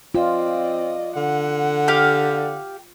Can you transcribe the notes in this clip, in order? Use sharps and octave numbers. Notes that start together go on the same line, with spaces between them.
C4 F4 D5 D#5
D3 F#5
G4 F5